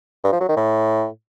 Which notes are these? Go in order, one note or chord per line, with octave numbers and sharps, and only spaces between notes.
G2
F3
F#3
D#3
A2